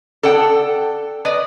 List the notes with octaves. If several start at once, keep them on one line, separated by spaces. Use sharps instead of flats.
A4 D5 F#5 G5
B4 D5 D#5